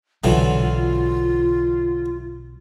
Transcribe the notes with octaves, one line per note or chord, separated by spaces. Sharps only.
B1 D3 E3 F#3 F4